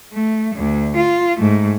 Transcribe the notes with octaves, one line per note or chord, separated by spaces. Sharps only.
A3
D2
F4
G#2 A3